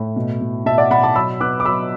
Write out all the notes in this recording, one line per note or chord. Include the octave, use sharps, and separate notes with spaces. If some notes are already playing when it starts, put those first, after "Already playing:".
Already playing: A2
B2
B2
B2 E5 A5
D5 F#5
B2 F#5 B5
A5 D6
F#3 B5 E6
B3 D6 F#6
D6
F#3 B5 E6